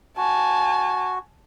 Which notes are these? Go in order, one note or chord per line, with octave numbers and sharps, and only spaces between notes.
F#4 G#5 A5